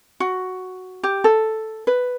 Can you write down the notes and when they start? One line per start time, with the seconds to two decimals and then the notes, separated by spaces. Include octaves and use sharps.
0.20 F#4
1.03 G4
1.24 A4
1.87 B4